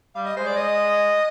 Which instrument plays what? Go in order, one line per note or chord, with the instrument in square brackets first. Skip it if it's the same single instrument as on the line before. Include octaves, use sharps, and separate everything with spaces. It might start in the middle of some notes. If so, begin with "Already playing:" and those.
[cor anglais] G3 [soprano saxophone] F5
[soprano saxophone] D#5
[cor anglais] G#3 [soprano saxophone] C5
[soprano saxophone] D5
D#5